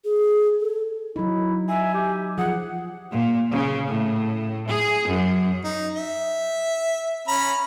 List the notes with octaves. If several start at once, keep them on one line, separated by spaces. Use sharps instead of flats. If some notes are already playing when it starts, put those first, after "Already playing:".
G#4
A4
F#3 D#4 E4
E5 G#5
G4
F3 G#4 F#5
A#2
C#3
A2
G#4
F#2
D#4
E5
C#4 A#5 B5